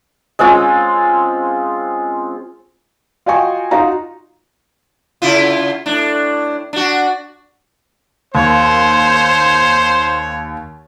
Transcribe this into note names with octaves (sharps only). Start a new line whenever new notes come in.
G#3 C4 C#4 F4
F4 F#4 D#5 G5 G#5 C#6
D#4 F4 F#4 A#5
C#3 E4 F4
A2 D4
D4 F#4
D#2 C5 C#5